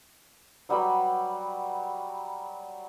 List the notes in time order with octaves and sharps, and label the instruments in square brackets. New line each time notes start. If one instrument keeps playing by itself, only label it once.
[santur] F#3 G3 B4 B5